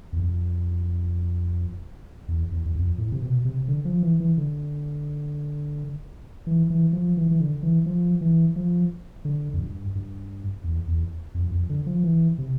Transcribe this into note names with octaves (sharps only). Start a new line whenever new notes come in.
E2
F2
E2
E2
E2
F2
A2
C3
B2
C3
D3
F3
E3
E3
D3
E3
E3
F3
E3
E3
D3
E3
F3
E3
F3
D3
F2
G2
G2
E2
E2
F2
F2
D3
F3
E3
C3